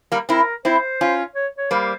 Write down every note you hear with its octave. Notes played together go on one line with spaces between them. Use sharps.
G3 A#3
C4 E4 A#4
C4 E4 C5
C#4 F4
C#5
C#5
G3 A#3 C5